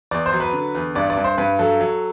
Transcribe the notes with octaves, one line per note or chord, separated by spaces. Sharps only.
E2 D5
C5
F#3
B4
D3
E2
G2 D5
D5
G2
C5
G2 B4
F#3 A4
F#3